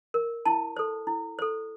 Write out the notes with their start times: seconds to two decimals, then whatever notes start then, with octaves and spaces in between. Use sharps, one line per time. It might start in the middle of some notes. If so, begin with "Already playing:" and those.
0.14 A#4
0.45 E4 A5
0.77 A4 C5
1.07 E4
1.39 A4 C5